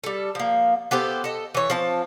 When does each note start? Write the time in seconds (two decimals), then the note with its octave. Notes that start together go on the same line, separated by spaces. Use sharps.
0.04 G3 A4
0.35 F3 A#3
0.91 B3 G4 A4 C5
1.24 A4 D#5
1.55 E3 C#5
1.70 F3 C4 A5